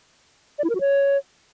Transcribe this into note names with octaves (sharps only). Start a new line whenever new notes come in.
D5
E4
A#4
F#4
C#5